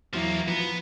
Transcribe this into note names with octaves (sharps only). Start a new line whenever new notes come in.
E2 F3 F#3 A#3 E4
F3 B3